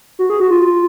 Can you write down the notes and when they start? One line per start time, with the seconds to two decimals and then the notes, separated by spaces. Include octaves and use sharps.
0.19 F#4
0.30 G#4
0.40 F#4
0.51 F4